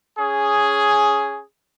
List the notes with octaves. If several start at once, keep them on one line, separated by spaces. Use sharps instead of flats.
C#4 G#4